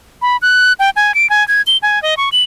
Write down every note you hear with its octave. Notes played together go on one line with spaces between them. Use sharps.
B5
F#6
G5
G#5
D7
G#5
G#6
G7
G#5
D#5
C#6
F#7